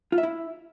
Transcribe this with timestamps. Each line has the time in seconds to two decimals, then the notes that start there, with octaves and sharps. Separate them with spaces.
0.12 F4
0.18 E5
0.23 E4